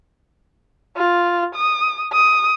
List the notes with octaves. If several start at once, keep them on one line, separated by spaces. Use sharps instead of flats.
F4
D#6
D#6